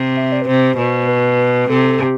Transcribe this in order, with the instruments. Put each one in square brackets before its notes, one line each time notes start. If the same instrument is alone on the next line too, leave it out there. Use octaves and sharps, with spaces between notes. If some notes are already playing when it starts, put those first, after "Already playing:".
Already playing: [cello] C3
[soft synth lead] E5
D5
B4
[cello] C3 [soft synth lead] C5
[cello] B2
[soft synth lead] B4
[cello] C3 [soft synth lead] A4
[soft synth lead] G4